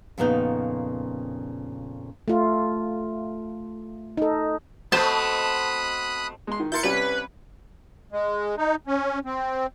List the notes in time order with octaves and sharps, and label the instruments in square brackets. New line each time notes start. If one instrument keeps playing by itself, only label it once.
[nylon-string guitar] F2 A#2 C#3 B3 C#4 D#4
[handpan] A3 F4
D#4 A4
[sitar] B2 A3 C4 [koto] C5 A5 [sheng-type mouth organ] B5 D#6 F#6
[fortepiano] G#3 C6
D#3
[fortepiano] E4 A#4 C6 [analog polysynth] G6 A6 C#7
[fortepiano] C2 G3 C#4 [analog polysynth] B4
[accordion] G#3
D#4
C#4
C4